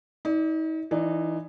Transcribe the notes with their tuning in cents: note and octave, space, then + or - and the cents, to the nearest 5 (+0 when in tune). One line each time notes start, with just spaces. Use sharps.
D#4 +40 D5 +0
E3 +5 D#4 -20 D5 +0